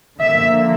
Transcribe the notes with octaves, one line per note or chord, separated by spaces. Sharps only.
D3 F3 A#3 E5